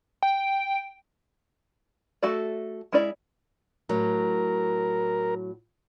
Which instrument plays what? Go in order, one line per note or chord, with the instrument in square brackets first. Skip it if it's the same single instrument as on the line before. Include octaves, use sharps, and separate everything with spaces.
[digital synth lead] G5
[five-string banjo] A3 F#4 A4 D5
G#3 C#4 E4 D5
[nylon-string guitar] A2 F#3 [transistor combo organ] A#4